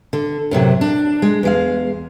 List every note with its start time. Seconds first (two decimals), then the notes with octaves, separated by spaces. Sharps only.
0.13 D3
0.51 F#2 A2 C3 F#3
0.81 D4
1.22 G#3
1.43 E2 G#3 F5